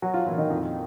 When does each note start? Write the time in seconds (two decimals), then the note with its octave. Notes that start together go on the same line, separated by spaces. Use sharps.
0.02 F#3 F#4
0.14 F3 F4
0.26 A#2 E3 E4
0.37 D#3 D#4
0.50 F2